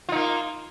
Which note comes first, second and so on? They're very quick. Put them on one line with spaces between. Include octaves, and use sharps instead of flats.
F4 D#4 A#3